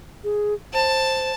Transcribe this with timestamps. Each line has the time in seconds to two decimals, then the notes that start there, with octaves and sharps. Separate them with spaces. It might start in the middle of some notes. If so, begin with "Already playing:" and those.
0.24 G#4
0.73 C5 A5